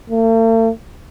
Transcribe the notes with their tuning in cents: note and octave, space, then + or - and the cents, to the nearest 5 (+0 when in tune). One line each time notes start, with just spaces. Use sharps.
A3 +45